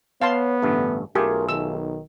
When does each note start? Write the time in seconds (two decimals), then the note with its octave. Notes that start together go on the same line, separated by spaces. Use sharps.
0.22 B3 C#5 F5 A5 C6
0.62 A1 G2 D3 A3
1.15 B1 A3 F4 G4 G#4 A#4
1.49 D#3 E6